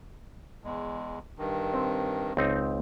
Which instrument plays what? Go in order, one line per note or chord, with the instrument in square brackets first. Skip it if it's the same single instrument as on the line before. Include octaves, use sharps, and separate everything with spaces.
[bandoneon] E2 G#3
G2 D#3
[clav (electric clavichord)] C4
C#2 C4 D#4